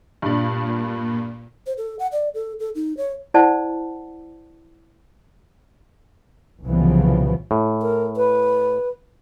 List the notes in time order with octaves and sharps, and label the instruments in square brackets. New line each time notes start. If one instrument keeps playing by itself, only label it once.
[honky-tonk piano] G2 D4 [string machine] A#2
[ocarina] C5
A4
F#5
D5
A4
A4
D#4
C#5
[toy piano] E4 C5 D5 F#5 A5
[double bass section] C2 A#2 C#3 E3 F3 B3
[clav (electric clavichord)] A2
[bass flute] A#4
B4